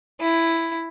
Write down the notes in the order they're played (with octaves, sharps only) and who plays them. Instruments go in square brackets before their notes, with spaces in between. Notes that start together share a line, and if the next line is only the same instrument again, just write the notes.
[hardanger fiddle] E4